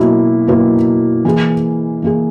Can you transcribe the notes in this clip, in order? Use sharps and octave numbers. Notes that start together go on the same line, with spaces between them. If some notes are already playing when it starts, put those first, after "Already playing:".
Already playing: B2 F#3 A#3 E4
B2 F#3 A#3 E4 B4
E3 A#3 E4 G#4
E3 A#3 E4 G#4